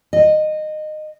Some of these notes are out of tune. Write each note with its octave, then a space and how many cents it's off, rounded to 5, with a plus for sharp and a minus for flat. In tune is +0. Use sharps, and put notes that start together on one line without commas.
D#5 -20